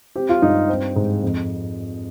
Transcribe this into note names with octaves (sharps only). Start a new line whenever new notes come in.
C4 G4
F4
G2 D#4
C4
G#2
F2